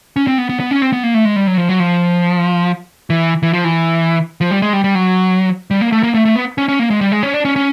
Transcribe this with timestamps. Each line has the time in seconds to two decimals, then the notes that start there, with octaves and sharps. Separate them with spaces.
0.16 C#4
0.28 C4
0.38 B3
0.49 B3
0.60 B3
0.71 C#4
0.82 C4
0.93 B3
1.03 A#3
1.14 A3
1.25 G#3
1.36 G3
1.47 F#3
1.58 F3
1.69 F#3
1.80 F3
3.10 E3
3.43 E3
3.53 F3
3.64 E3
4.41 F3
4.51 G3
4.62 G#3
4.73 G3
4.84 G3
4.95 F#3
5.71 G3
5.81 A#3
5.92 A3
6.03 A#3
6.14 A3
6.25 A3
6.36 B3
6.58 C#4
6.68 C#4
6.79 A#3
6.90 G#3
7.01 G3
7.12 G#3
7.23 C#4
7.34 D4
7.45 C#4
7.56 C#4